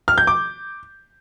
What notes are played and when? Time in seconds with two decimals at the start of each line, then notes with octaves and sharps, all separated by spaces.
0.08 F6
0.18 G6
0.27 D6